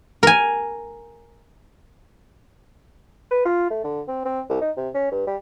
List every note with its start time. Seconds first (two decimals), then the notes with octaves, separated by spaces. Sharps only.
0.23 A#4 G#5
3.31 B4
3.45 F4
3.70 A3
3.84 D3
4.08 C4
4.25 C4
4.50 C2
4.61 D#4
4.77 C3
4.94 C#4
5.12 G2
5.27 G3